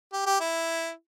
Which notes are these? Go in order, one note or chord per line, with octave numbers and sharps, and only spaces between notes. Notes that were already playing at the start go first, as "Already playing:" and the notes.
G4
G4
E4